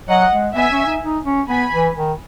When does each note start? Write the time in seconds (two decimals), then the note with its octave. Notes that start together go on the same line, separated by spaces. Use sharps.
0.09 F#3 D#5 F#5
0.32 G#3
0.56 B3 E5 G#5
0.72 C#4
0.87 D#4
1.03 D#4
1.26 C#4
1.49 B3 G#5 B5
1.73 E3
1.96 D#3